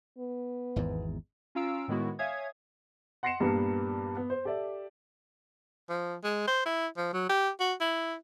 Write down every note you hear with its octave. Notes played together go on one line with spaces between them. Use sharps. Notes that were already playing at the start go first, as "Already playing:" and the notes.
B3
G#1 E2 G#2
C#4 F4 F5 A#5 E6 D7
A2 D#3 G#3 B3 E4 F#4
C#5 E5 F5 G#5 D#6 G#6
F#5 C6 A#6 C7 C#7 E7
G2 A#2 G3 A#3 B3 D4
B3
C5
G4 A4 D5 E5
F3
G#3
C5
E4
F3
F#3
G4
F#4
E4